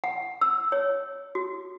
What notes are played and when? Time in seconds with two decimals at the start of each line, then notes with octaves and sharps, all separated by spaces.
0.04 F#5
0.41 E6
0.72 C#5
1.35 F#4